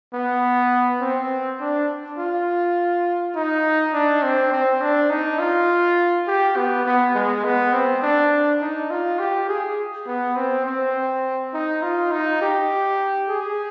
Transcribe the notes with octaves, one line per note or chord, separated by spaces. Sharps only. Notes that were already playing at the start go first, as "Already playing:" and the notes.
B3
C4
D4
F4
D#4
D4
C4
C4
D4
D#4
F4
G4
B3
B3
G#3
B3
C4
D4
D#4
F4
G4
G#4
B3
C4
C4
D#4
F4
D#4
G4
G#4